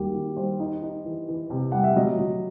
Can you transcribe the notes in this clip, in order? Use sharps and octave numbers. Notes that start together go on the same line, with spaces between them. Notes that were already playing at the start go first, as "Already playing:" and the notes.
Already playing: D#2 D#3 G3 F#4 G4
D#3
G3 C5
D#4
D#4
E3
E3
C3
G3 F#5
E5
F#3 D#5
F#3